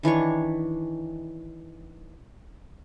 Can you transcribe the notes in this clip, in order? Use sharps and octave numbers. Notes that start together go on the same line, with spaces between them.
D#3 E3 D4 C#5